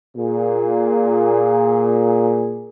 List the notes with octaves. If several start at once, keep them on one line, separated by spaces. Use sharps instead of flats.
A#2 G#4